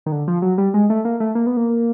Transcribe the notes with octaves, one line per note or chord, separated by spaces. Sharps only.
D#3
D3
F3
F#3
G3
G#3
A3
A#3
A3
A#3
B3
A#3